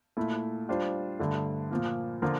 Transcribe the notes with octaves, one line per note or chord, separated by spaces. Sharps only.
A#2 A3 E4
G3 D4 F4 C5
G2 D3 A3
A#2 F3 A#3
D3 F3 A#3 F4 A#4